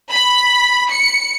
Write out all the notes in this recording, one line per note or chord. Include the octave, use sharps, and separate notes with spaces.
B5
C#7